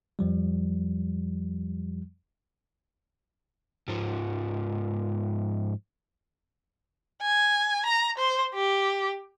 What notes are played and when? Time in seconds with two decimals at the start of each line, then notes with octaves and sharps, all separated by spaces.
0.19 F2 F3 G3
3.88 G#2 F3
7.22 G#5
7.86 A#5
8.18 C5
8.54 G4